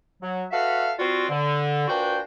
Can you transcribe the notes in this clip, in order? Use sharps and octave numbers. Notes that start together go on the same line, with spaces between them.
F#3
F#4 A4 B4 E5 F5
G3 C4 F4 F#4
D3
A#2 D4 F#4 B4 C5 G5